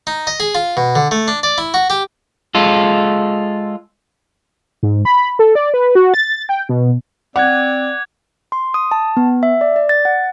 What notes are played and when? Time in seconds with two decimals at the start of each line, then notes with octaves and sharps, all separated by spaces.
0.07 D#4
0.27 D#5
0.40 G#4
0.55 F4
0.77 B2
0.95 D3
1.11 A3
1.28 D4
1.43 D5
1.58 E4
1.74 F#4
1.90 G4
2.55 G#3 F4 A4
4.83 G#2
5.05 B5
5.39 A4
5.55 D5
5.74 B4
5.95 F#4
6.14 A6
6.49 G5
6.69 B2
7.36 C4 D5 F#5 D6 F#6 G#6
8.52 C6
8.74 D#6
8.91 A5
9.17 B3
9.43 E5
9.61 D5
9.76 D5
9.89 A6
10.05 F#5